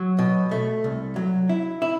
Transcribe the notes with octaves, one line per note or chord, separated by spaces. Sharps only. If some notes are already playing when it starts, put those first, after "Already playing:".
Already playing: F#3
B2
A3
C2
F#3
E4
E4